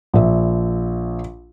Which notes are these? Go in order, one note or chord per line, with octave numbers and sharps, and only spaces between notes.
A#1 E5